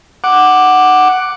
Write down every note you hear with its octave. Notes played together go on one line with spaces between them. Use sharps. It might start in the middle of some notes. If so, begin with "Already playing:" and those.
F#5 D6